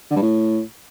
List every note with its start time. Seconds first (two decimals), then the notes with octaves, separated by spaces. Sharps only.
0.11 D3
0.16 G2
0.22 A2